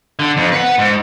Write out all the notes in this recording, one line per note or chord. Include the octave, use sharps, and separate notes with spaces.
D3
F2
B4 F#5
G#2